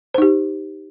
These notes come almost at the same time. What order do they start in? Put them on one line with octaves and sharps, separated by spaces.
C5 D#4 G4